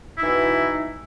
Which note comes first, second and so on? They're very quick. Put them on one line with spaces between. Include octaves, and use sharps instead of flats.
E4 D#4 E3 B2